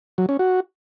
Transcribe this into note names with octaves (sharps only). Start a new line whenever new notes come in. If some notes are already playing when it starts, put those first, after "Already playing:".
F#3
C#4
F#4